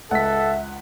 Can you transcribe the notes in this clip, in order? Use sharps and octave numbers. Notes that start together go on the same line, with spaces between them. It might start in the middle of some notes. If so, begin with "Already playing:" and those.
C#2 A4 E5 F#5 B6